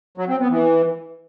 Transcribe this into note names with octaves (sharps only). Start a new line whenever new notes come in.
F#3
C4
B3
E3